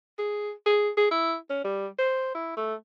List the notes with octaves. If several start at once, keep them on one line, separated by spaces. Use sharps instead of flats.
G#4
G#4
G#4
E4
C#4
G3
C5
E4
A3